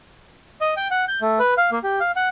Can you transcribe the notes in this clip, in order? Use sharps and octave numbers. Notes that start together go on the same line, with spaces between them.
D#5
G5
F#5
G6
A3
B4
F5
A#3
G4
F5
F#5